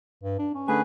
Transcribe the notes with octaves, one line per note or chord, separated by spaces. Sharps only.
G2
D4
C#4
D3 A3 G#4 B4 G#5